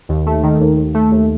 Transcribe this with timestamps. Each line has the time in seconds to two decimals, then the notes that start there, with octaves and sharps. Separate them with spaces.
0.09 D#2
0.26 A3
0.43 D#3
0.61 D#2
0.77 D#2
0.94 A3
1.12 D#2